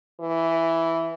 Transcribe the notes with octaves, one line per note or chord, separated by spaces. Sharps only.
E3